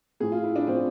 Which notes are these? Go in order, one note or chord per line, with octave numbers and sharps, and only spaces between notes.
A2 F3 A3 G#4
F4
E4
D4
A2 F3 A3 C4